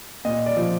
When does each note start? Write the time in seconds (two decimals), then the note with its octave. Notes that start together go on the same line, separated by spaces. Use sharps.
0.25 A#2 D#5
0.46 D5
0.57 F3